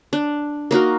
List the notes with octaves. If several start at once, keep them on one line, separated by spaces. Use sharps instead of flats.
D4
A#3 D#4 F#4 A#4